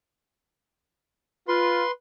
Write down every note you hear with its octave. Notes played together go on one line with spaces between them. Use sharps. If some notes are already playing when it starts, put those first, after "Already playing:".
F4 B4 C6